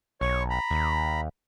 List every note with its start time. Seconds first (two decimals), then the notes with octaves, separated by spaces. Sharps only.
0.21 B1 C#5 C#6
0.50 A#5 B5
0.71 D#2